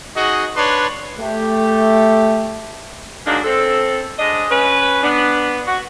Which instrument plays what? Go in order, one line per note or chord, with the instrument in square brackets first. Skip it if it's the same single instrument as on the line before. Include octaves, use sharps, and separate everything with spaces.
[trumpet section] D#4 F#4 G#4 D#5
D4 B4 C#5 C6
[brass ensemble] A3 G4
[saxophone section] F#3 G#3 A#3 D4 D#4
C4 A4
G#3 D4 D#5
C#4 B4
B3 D4
F#4